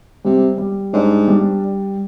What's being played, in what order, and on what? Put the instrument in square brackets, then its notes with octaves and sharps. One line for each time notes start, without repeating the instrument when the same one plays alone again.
[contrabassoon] C3 [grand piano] G3
[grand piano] G3
[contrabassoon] G#2 [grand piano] D4
[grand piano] G3